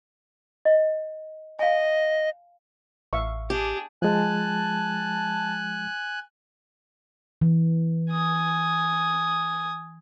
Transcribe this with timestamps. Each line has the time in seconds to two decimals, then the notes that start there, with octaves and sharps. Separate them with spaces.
0.65 D#5
1.59 D#5 F5 G#5
3.13 A1 E5 F5 C#6
3.50 D4 G4 G#4
4.02 F3 G#3 G#5 A5 F#6
7.41 E3
8.11 G#5 D#6